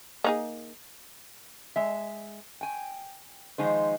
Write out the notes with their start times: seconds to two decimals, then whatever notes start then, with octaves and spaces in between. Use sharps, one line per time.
0.24 A#3 D#4 G#4
1.76 G#3 E5
2.61 G5 G#5
3.58 D#3 F3 G#3 D#4 C5